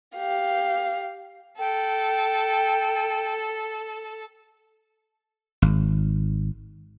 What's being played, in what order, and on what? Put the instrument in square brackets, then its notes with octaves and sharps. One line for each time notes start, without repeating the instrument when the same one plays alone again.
[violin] G4 F5
[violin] A4 [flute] G5
[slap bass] G#1